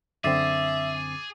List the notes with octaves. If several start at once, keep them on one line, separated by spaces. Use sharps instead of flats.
F#2 D3 C4 G#4 E5 D6 A6 C7